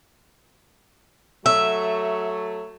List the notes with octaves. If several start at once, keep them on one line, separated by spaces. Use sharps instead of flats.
F#3 A3 E5